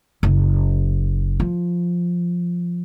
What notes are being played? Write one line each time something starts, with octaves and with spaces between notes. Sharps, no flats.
F#1
F3